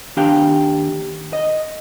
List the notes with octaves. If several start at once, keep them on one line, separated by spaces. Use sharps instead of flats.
D#2 D4 G4 F5 G5
D#5